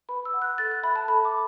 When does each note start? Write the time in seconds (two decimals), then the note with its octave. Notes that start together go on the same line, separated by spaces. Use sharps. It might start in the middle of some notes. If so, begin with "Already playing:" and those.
0.09 B4 B5
0.25 E6
0.34 F#5
0.42 F#6
0.58 A4 A6
0.71 F#6
0.83 E5 B5
0.96 A5
1.08 A4 B5
1.25 D6